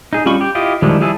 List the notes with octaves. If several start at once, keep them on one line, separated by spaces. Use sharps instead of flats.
D#4 G#4
G3 C#4 F4 B5 C#6
G4
E4 F4 G4 D#5
D#3 F3 G3 G#3 E4
F3 G3 E4 G#4 A4